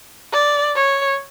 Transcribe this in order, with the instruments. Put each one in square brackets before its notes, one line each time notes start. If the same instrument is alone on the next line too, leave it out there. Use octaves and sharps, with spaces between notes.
[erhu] D5
C#5